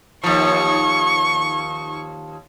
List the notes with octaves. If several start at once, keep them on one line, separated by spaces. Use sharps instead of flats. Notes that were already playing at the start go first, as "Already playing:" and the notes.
D#2 F3 C#6